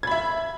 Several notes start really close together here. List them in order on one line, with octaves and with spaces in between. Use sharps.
G#6 B5 E5